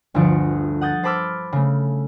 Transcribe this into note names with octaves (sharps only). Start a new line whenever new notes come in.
G1 D2 D3 F3 C#7 D7
F#5 D#6 G6 A6
C5 A5 B5 D6 E6 F6
C#3 A3